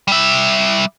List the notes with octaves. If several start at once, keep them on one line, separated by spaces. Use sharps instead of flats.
G3 E5